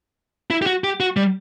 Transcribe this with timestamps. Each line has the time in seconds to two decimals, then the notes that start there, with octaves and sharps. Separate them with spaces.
0.50 E4
0.62 G4
0.66 F#4
0.84 G4
1.00 F#4
1.17 G3